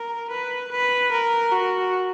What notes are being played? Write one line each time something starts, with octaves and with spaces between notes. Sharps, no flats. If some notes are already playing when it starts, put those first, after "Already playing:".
Already playing: A#4
B4
B4
A#4
F#4